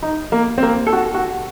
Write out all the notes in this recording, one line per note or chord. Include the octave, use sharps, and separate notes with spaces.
D#4
A#3
C4
A#3
A4
F#4
F#4